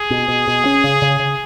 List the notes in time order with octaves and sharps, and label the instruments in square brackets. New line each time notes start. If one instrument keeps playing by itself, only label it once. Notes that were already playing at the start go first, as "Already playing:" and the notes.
Already playing: [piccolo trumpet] G#4
[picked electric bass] B2
B2
B2
C#4
C#3
C#3
C#3